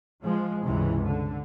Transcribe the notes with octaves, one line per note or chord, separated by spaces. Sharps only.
F3 G#3
C#2 G2 C3 E3
D3